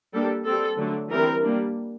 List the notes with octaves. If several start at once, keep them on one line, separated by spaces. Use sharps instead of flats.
G3 A#3 D4 A4
G3 C4 A4
D3 F#3 A3 D4
E3 G3 C4 A#4
G3 A#3 D4